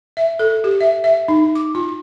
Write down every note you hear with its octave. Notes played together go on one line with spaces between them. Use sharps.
E5
A4
G4
E5
E5
D#4
D6
F4